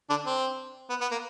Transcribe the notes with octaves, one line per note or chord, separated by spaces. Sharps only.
D3 D4
C4
B3
B3
A#3